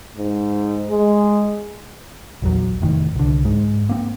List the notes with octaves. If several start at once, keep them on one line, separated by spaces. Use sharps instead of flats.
G#2
G#3
A#1 E2 F#3
F1 A2 D#3
C2 D3
G#2 G#3
A#3 C4